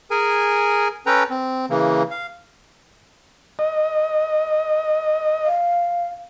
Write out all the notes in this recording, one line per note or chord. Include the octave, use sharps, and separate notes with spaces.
G#4 A#4 G#5
C#4 A4 B4 G5 A#5
C4
C#3 E3 A#3
F5
D#5
F5